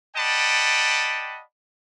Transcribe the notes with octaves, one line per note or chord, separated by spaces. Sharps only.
D5 D#5 F#5 G5 A5 B5